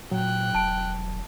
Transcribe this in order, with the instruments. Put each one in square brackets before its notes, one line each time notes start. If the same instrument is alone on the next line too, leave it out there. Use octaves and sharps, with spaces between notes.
[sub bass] A#2 [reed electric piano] F#3 [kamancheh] G5 F#6
[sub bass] E1 [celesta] A5 D7